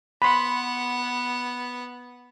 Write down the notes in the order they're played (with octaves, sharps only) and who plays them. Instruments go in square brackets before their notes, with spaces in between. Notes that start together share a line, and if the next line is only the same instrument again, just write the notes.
[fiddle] B3 F#5 [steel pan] B5 C6